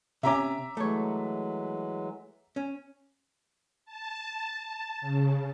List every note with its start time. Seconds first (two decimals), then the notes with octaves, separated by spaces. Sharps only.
0.23 C3 C#4 E5 A#5 D6
0.77 E3 F#3 G#3 A3 C#5
2.56 C#4
3.85 A5
4.64 A5
5.01 C#3